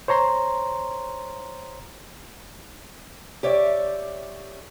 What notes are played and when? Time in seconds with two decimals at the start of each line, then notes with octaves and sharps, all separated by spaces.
0.08 C5 C#5 A#5 C6
3.43 G4 C#5 D5 E5